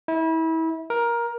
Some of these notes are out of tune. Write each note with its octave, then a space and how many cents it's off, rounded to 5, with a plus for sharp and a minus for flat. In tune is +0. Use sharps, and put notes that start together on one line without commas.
E4 -30
A#4 +15